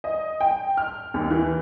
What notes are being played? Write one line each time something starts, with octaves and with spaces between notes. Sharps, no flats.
D#5
G5
F6
D#2
E3